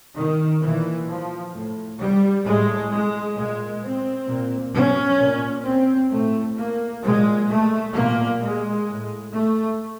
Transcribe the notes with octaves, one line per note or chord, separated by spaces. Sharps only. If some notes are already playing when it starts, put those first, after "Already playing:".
D#3
A#2 E3
F3
A2
G3
A2 G#3
G#3
A#2 G#3
C4
A#2
C#4
A#2
C4
A2 A3
A#3
A#2 G#3
A3
A#2 A#3
G#3
A2
A3